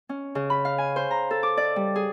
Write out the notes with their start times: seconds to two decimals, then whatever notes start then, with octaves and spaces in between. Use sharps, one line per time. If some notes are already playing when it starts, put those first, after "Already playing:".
0.09 C#4
0.35 C#3
0.50 B5
0.65 F5
0.78 G#5
0.96 C5
1.11 A#5
1.31 A4
1.43 D6
1.57 D5
1.76 G3
1.96 G#4